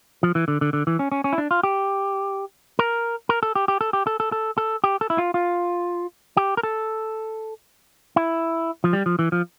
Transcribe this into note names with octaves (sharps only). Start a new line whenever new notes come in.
F3
E3
D3
D3
D3
E3
C#4
C#4
C#4
E4
D4
F4
G4
A#4
A#4
A4
G4
G4
A4
G4
A4
A4
A4
A4
G4
A4
E4
F4
F4
G4
A#4
A4
E4
F3
G3
F3
E3
F3